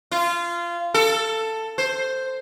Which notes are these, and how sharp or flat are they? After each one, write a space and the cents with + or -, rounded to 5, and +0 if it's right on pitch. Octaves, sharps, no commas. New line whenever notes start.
F4 -20
A4 +10
C5 +0